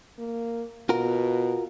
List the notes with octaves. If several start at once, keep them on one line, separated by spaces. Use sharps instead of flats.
A#3
B2 F4 F#4 A#4